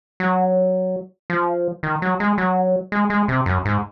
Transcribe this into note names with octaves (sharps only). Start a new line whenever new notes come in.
F#3
F3
D#3
F#3
G#3
F#3
G#3
G#3
C3
F#2
G#2